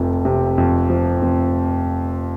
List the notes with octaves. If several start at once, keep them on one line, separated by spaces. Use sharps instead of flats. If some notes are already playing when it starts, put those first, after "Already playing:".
Already playing: F1 F2 F3
C3
F2
F3
F1